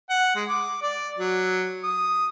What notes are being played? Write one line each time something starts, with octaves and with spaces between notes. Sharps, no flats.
F#5
G#3
D6
D5
F#3
D#6